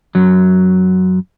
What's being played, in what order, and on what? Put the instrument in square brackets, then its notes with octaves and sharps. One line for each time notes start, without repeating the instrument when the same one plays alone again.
[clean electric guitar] F#2 F#3